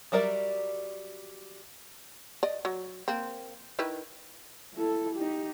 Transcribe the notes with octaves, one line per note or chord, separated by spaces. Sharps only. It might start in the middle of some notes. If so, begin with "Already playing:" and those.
F#3 G3 A#4 D5 E5
D5 D#5
F#3
A#3 C4
D#3 E4 B4
E4 A4
D#4 G4